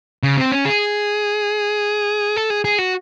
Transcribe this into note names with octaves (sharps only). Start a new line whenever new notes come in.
C#3
C4
C#4
G#4
A4
G#4
G#4
F#4